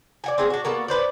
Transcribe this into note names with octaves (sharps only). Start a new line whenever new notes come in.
D5 F#5 G#5
C4 G#4 F#5
D4 F#4
A#3 B3 F#4 A4
D4 B4 C5 D5